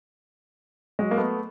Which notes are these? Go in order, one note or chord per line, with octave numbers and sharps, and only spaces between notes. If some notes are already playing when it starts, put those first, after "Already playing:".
F#3 G#3
A#3
A3 B3